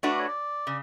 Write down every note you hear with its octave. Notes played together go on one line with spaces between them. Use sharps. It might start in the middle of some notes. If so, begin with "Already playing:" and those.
A3 D4 F#4 B4
D5
C#5
D5
C#3